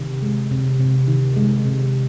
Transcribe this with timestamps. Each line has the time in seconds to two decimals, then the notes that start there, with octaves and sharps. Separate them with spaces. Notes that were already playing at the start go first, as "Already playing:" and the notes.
Already playing: C3 D#3
0.22 G#3
0.51 C3
0.80 C3
1.08 D#3
1.36 G#3
1.65 C3